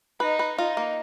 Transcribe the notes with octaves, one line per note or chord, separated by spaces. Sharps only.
D#4 B4
B4
D#4 F4
A#3